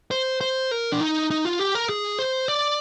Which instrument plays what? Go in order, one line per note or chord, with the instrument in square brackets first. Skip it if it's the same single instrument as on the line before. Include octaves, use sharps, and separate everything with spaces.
[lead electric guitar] C5
C5
A#4
D4
D#4
D#4
F4
G4
A#4
G#4
C5
D5